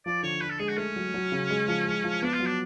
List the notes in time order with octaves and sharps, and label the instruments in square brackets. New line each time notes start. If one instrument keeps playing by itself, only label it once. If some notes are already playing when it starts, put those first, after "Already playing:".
[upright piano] F3 [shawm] D5
[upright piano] D3 [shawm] C#5
[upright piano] D4 [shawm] B4
[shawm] A4
[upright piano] G#3 [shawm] G#4
[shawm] F#4
[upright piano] A3 [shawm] C#4
[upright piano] F#3
F#3
C#3
G#3
F3
G#3
F3
[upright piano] B3 [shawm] D4
[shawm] F4
[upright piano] F#3
[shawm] D4